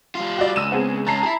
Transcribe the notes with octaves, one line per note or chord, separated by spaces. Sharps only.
G3 F4
F#4 D5
C#2 E6 D#7 E7
B3 C4 G#4
C#2 C#4 A5 A#5 C7
E4 G#4